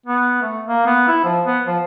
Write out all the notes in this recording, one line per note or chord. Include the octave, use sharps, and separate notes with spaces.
B3
A3
A#3
B3
E4
F3
B3
F3